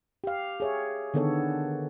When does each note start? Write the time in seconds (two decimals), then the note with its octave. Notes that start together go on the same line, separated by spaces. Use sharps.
0.24 G4 F5
0.60 G#4 C#5 E5
1.14 D3 D#3 B3 A4 C#5